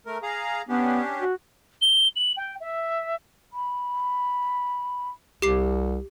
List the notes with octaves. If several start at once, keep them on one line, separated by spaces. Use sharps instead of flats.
A3 A#4
G#4 F5 A#5
B3 C#4 D4 G4
F#4
G7
F#7
G5
E5
B5
C2 G4 D6 C7